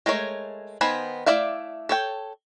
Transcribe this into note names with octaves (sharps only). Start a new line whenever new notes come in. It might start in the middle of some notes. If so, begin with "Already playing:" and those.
G#3 A3 A#4 C#5
D#3 B3 C5 G#5 B5
A3 E4 D5 E5 F5
A4 C#5 G5